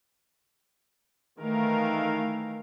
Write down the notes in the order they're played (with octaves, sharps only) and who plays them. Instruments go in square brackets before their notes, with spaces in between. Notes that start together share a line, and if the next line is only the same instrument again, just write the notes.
[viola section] D#3 E3 A3 A#4 F5